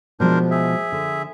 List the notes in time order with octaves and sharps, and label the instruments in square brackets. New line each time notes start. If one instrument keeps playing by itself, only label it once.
[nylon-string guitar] B2 F3 G#3 [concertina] D4 A#4 C5
[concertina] G#4 E5
[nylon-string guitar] D3